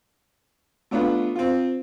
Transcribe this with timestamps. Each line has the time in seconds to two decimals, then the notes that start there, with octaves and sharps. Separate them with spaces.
0.91 A3 B3 D4 F4 B4
1.36 C4 F4